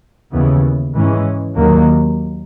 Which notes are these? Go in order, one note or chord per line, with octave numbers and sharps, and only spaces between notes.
D#2 C#3 E3 B3
G#2 E3 G#3 C#4
D#2 D#3 F#3 A#3